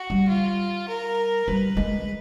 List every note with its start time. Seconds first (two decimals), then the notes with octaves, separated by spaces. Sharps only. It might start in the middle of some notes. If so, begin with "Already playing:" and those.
Already playing: F#4
0.10 G3
0.28 F4
0.88 A#4
1.48 G3 B4
1.77 G#3